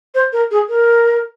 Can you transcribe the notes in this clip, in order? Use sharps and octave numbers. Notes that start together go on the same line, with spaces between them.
C5
A#4
G#4
A#4